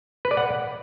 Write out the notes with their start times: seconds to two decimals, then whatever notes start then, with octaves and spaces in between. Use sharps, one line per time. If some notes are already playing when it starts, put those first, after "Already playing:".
0.25 B4
0.31 D5
0.37 F#5